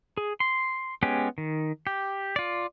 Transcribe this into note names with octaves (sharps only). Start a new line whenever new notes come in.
G#4
C6
G#3 B3 C#4 G4
D#3
G4
F4 D5